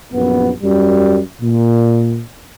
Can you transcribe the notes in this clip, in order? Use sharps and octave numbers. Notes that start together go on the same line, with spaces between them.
A#1 F#2 B3
F#2 G3
A#2